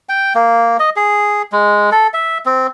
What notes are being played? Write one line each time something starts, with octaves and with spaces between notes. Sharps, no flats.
G5
A#3
D#5
G#4
G#3
A4
E5
C4